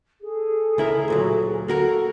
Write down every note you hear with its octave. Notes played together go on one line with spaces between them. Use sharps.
G#4 A4
C#2 E4 A#4
D2 A#2 F#3
A#3 F#4 A4 A#4